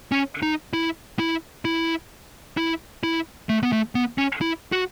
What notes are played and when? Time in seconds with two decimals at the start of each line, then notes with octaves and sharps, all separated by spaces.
0.12 C#4
0.43 D#4
0.73 E4
1.19 E4
1.65 E4
2.57 E4
3.03 E4
3.49 A3
3.63 B3
3.72 A3
3.95 B3
4.18 C#4
4.41 E4
4.72 F#4